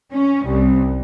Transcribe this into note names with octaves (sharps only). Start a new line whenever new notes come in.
C#4
C2